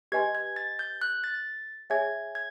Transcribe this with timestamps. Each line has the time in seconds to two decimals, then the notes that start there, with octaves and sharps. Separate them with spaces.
0.12 G4 B4 D#5 G#5 C6 G#6
0.35 G#6
0.56 A6
0.79 G6
1.02 F#6
1.24 A6
1.34 A6
1.90 G#4 C#5 E5 G#5 G#6
2.35 G#6